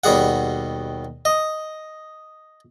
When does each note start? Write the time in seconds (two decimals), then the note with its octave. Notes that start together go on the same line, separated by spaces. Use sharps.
0.04 D#2 B2 G3 G#4 F#5
1.25 D#5